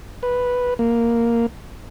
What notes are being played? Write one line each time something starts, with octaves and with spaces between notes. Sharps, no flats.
B4
A#3